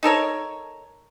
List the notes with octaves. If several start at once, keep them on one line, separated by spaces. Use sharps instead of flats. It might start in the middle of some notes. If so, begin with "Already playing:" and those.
D#4 A4 A#4 C#5